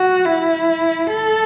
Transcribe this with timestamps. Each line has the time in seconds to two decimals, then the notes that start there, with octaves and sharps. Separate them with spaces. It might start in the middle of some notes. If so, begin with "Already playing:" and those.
Already playing: F#4
0.25 E4
1.07 A4